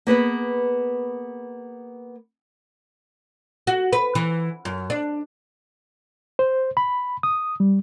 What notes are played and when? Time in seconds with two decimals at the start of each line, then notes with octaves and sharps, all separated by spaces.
0.07 A#3 B3 G#4 B4
3.67 F#4
3.93 B4
4.15 E3
4.65 F#2
4.90 D4
6.39 C5
6.77 B5
7.23 D#6
7.60 G3